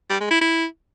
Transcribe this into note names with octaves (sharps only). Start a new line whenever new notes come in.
G3
G#3
E4
E4